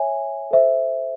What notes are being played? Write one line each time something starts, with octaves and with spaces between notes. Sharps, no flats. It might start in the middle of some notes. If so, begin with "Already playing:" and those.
Already playing: C#5 E5 G#5
A4 C5 E5